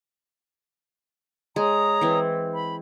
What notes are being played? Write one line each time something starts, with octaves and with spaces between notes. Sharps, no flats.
G#3 C#5 A#5 D#6
E3 C4
B5